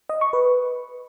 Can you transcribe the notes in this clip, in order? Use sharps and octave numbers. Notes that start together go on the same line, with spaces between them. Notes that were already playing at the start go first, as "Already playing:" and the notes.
D#5
C#6
B4